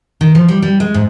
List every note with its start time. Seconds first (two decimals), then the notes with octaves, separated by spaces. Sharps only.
0.21 D#3
0.35 F3
0.48 G3
0.62 G3
0.80 G#3
0.94 G#2